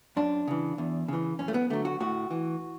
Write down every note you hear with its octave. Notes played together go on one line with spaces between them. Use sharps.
F#2 D4
C#3 E3
E2
C#3 E3
F#2 C#4
A3
B3
D3 F#3 A3
F#4
A2 F#4
E3